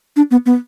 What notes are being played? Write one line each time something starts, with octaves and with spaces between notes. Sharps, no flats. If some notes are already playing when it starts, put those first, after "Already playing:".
D4
B3
B3